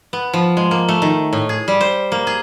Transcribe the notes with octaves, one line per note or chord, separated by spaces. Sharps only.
B3
F3
G#3
A#3
A3
D#3
A2
G#4
G3
C5
A#3
G#4